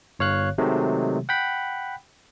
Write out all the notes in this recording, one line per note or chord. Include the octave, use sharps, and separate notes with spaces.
G1 C#5 F5 F#6
C3 D#3 F#3 G#3 A3
F#5 G5 B5